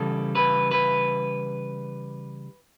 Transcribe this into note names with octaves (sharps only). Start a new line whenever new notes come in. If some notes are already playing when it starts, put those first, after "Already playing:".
Already playing: C#3 E3 G3 A4
B4
B4